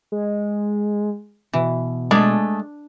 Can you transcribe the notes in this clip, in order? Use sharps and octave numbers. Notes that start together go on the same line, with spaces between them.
G#3
B2 E3
G#3 A3 D4